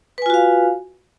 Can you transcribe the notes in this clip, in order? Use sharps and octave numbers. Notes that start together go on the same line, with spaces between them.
F4 F#4 B4 F5 G#5